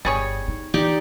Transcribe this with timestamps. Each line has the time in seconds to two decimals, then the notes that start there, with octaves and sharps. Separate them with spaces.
0.05 G1 G3 G#4 C#5
0.48 D#4
0.74 E3 D#4 G4 D5